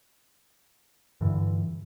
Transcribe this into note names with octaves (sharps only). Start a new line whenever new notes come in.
G2 D3 E3